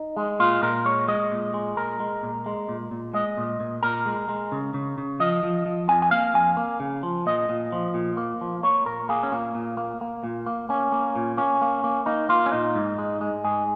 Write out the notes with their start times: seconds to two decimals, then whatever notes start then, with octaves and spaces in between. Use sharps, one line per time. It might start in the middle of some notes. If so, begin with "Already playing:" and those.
Already playing: D#4
0.17 G#3
0.39 A#2 F4
0.62 A#2 A#4
0.85 G#3 C#5
1.08 G#3 D#5
1.31 A#2
1.54 G#3
1.77 A#2 A#4
2.00 G#3
2.23 A#2
2.46 G#3
2.69 A#2
2.91 A#2
3.13 G#3 D#5
3.37 A#2
3.60 A#2
3.83 A#2 A#4
4.06 G#3
4.29 G#3
4.52 C#3
4.74 C#3
4.98 C#3
5.20 F3 D#5
5.43 F3
5.66 F3
5.88 F2 G#5
6.02 G#5
6.11 A#3 F5
6.34 F2 G#5
6.57 A#3
6.80 C#3
7.03 F3
7.26 A#2 D#5
7.49 A#2
7.72 F3
7.94 A#2
8.17 A#3
8.41 F3
8.63 A#3 C#5
8.86 A#2 A#4
9.09 A#3 G#4
9.23 C#4
9.32 A#2 A#3
9.55 A#2
9.77 A#3
10.01 A#3
10.24 A#2
10.46 A#3
10.69 A#3 C#4
10.92 A#3
11.16 A#2
11.37 A#3 C#4
11.61 A#3
11.84 A#3
12.06 A#3 D#4
12.29 A#3 F4
12.46 C#4
12.52 A#2 D#4
12.75 G#2
12.98 G#3
13.21 G#3
13.44 G#2 G#4